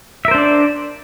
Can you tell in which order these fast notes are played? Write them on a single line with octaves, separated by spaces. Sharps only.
E5 A#4 C5 D4 D5